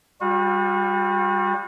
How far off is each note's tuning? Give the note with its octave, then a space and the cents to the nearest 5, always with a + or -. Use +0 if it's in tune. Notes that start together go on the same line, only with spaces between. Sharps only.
G3 +20 F#4 -40